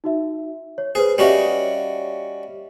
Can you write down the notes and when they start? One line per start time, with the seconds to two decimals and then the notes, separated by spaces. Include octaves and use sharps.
0.04 D#4 F#4 E5
0.78 C#5
0.95 G#4 B4 C5
1.18 G3 C#4 F#4 C#5 D#5 E5